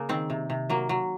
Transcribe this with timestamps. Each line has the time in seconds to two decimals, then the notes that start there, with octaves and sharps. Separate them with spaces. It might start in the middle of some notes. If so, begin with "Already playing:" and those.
Already playing: C#3 A#3
0.09 D#3 C4
0.30 C3
0.50 C3
0.70 F#3 A#3
0.89 F#3